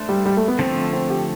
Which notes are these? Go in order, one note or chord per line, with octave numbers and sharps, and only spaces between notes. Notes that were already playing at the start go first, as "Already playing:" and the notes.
Already playing: A3 D4 A4 C5
G3
G3
A3
B3
D3 F3 A3 C4
C4
G4